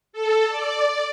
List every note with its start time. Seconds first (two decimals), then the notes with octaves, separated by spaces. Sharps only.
0.13 A4
0.49 D5